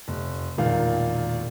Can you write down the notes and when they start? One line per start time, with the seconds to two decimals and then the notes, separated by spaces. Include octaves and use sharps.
0.08 F1
0.58 E1 A#2 D#3 F5